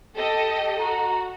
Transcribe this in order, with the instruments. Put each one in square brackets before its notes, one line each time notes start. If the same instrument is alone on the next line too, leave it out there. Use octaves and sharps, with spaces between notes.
[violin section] G4 A4 D#5
[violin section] F#4 [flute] A#5